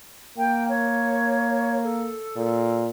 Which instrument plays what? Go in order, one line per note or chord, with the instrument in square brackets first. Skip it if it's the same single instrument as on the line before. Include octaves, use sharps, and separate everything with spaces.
[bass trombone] A#3 [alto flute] G5
[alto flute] C#5
A4
[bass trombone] A#2